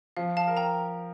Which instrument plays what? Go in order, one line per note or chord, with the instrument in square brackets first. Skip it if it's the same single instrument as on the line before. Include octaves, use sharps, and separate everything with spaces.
[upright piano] F3 [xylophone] F5
[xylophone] F5 A5
[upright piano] A#4
[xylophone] G5 A#5